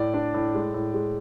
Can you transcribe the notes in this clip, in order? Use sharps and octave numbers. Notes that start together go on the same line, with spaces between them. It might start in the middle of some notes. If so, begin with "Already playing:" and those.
Already playing: A2 D5
D4
A2
G#3
A2
G#3